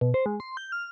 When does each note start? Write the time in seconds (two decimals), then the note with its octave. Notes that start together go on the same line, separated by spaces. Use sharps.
0.01 B2
0.14 C5
0.26 G#3
0.40 C6
0.57 G6
0.72 F6